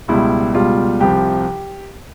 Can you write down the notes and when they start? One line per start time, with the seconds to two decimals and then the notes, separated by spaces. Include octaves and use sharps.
0.08 C#2 B2 G3 E4
0.54 C#2 B2 G3 F4
1.01 C2 C3 F3 G4